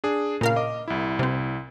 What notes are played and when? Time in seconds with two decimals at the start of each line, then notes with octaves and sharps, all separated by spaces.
0.04 D4 G#4
0.41 A#2 C#3 A#4 F5
0.56 D#5 D6
0.88 C2 E4
1.19 C3 C4